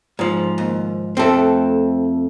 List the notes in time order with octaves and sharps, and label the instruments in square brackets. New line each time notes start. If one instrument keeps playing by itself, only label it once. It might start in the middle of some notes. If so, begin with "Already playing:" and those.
[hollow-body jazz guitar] G#2 F3
[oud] D#2
[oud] F2 A3 [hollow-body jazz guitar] C4 A4